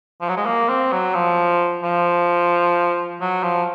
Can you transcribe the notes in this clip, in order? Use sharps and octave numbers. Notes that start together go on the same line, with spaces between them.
F3
F#3
G#3
A#3
C4
F#3
F3
F3
F#3
F3